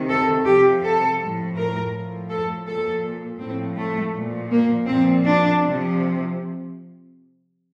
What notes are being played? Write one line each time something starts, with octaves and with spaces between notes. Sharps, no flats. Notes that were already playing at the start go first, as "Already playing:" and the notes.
Already playing: C3 D#3
A4
C3 F3 G4
A4
A2 F3
A#4
A2 F3
A4
A#2 F3 A4
A2 F3 C4
A3
A#2 F3
A#3
A#2 F3 C4
D4
C3 F3